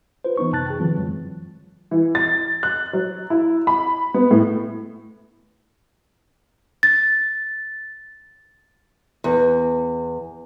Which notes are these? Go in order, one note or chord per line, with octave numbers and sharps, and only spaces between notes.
F4 B4 C5
E3 B3 D#4 C#6
F#2 C3 A5 F#6 A6
G#4 G5
D3 E3 F#3 C4 F4
F#2 F#3 G#3
E3
A6
F#6
F#3
E4
B5
B3
A2
A6
E2